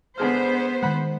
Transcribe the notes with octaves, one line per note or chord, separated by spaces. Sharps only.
D3 G#3 B3 C5 F6
D#3 G#3 F#5 B5